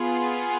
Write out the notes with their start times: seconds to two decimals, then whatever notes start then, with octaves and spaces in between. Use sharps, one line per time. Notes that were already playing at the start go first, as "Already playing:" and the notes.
Already playing: B3 F4 G#4